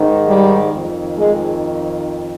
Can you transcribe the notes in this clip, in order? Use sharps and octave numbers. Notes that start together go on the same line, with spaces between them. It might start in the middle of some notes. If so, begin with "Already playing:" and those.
Already playing: G#2 D#3
G3
F2 D#3
G#3